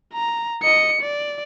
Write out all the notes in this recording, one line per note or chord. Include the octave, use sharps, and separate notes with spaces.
A#5
D#5 C#7
D5